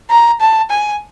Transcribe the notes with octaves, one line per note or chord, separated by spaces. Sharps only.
A#5
A5
G#5